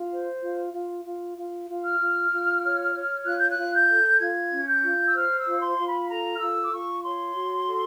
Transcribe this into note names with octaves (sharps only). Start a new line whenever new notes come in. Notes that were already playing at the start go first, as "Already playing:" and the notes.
Already playing: F4
C5
F4
F4
F4
F4
F4
F6
F4
F4
C#5
C#5
F4 F#6
G6
F#6
F4
G6
A4
F4 G#6
C#4
G6
F4
E6
C5 F6
E6
F4
C6
F4
B5
A4 A#5
F6
F4 E6
D6
F4 C#6
C#5 C6
F#4
A4